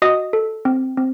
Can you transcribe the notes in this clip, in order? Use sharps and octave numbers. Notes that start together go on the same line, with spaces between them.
F#4 D#5 D#6
A4
C4
C4